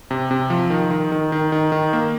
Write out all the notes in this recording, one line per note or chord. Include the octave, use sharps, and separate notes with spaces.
C3
C3
F3
D#3
D#3
D#3
D#3
D#3
D#3
A#3